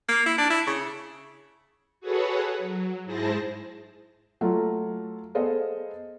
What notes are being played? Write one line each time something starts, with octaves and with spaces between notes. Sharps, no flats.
A#3
E4
D4
E4
C#3
F#4 G#4 A4 B4 C#5 F#5
F#3
G#2 E4 G#4 C5 A5 A#6
F#3 A3 F4 A4
B3 G#4 A4 C5 D#5 F5